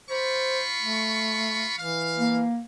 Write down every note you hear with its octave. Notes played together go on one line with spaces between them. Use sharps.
F4 C5 B5 C#6
A3
E3 F5
A#3